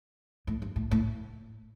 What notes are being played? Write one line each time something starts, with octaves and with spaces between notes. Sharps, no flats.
A2
G2
A2
A2